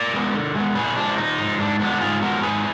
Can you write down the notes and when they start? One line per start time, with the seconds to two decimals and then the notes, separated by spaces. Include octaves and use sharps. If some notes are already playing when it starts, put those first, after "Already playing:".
Already playing: A#4 D5
0.13 G#3 B3
0.34 D3
0.55 G#3 B3
0.75 A#2 G#4 B4
0.96 F3 G#3 D4
1.17 A#2 D#4
1.38 F3 G#3
1.59 G#2 D4
1.80 F3 G#3 B3 D4
2.01 G#2 F4 G#4
2.22 F3 G#3 B3 F#4 A#4
2.43 G#2 G#4 B4